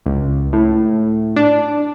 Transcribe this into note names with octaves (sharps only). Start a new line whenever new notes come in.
C#2
A2
D4